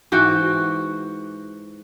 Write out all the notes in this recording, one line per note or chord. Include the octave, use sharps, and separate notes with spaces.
G#2 E3 F#4 G5